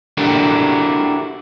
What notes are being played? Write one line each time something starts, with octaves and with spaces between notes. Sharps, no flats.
D4 E4 F#4 G4 A4 A#4